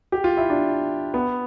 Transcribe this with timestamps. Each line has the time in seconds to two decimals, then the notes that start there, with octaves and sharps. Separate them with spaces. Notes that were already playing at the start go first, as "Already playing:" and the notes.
0.12 G4
0.24 F4
0.37 E4
0.50 D4
1.14 B3